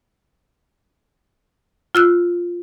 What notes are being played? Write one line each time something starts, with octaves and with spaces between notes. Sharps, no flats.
F4 E6 F#6